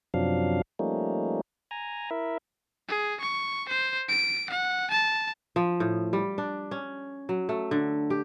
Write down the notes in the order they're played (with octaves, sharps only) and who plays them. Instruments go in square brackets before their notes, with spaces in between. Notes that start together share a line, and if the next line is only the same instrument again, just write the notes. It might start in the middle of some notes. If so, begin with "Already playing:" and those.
[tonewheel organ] F#2 C3 F3 F#3 D4 F5
F3 G3 A3 A#3 C#4 D#4
G#5 A#5
E4 A#4 E5
[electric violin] G#4
C#6
C5
D7
F#5
A5
[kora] F3
A2
G3
D4
C#4
F#3
A3
D3
G4